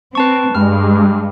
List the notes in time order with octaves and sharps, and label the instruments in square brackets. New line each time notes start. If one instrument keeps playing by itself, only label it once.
[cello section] C4 [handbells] B4 A5 C#6
[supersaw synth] G2 [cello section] G#3 [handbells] F6